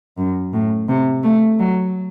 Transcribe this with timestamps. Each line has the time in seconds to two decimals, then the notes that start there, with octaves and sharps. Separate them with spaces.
0.18 F#2
0.53 A2
0.88 C3
1.24 A3
1.59 F#3